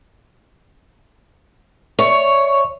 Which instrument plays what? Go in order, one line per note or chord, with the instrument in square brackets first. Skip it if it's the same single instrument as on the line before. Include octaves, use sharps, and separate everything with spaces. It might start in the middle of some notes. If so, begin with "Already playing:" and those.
[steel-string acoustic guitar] C#5 [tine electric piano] D5 E5 C#6